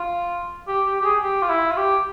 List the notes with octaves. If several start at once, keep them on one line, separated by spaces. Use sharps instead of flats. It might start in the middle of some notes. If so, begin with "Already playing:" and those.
Already playing: F4
G4
G4
G4
G#4
G4
F4
E4
F4
G4